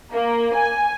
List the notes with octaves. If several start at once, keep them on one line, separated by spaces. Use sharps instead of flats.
A#3
G#5